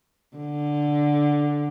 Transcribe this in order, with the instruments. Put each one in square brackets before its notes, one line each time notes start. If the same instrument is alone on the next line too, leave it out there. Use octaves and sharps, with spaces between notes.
[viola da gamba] D3